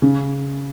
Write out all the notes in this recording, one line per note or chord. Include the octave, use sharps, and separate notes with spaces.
C#3